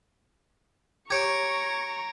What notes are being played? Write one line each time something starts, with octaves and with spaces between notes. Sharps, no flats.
G4 C#5 A#5 C#6 G#6 C#7 D7